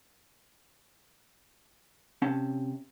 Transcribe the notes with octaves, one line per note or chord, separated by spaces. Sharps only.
C3 C#4 F5 A5